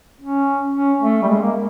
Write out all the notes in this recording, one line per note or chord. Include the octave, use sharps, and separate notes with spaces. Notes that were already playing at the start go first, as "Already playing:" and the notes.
C#4
C#4
A3
G3
G#3
A#3